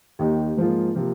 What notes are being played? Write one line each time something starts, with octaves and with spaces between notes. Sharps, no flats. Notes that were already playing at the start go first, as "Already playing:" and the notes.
D#2 D#3 A#3 D#4 G4
G#2 F3 A#3 F4 G#4
C3 F3 A#3 F4